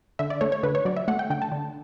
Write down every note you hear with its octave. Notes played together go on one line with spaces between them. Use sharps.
D3 E5
D5
A3 C#5
C#5
D3 B4
C#5
F#3 D5
E5
A3 F#5
G5
D3 G5
A5
D3